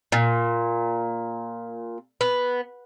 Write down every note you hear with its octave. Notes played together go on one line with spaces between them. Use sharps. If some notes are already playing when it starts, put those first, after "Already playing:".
A#2
B3